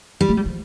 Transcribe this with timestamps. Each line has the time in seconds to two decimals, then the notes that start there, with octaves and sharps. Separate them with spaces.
0.21 G3
0.29 A3
0.37 G3
0.46 F3